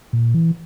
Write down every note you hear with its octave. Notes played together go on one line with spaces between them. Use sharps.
A#2
E3